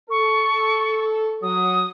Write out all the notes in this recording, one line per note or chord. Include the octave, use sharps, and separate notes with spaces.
A4 C#6
F#3 D#6